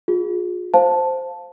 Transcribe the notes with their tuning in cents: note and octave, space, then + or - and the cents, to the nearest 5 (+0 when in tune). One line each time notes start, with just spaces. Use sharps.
F4 +40 G#4 +0
C5 +0 F5 +10 A5 +0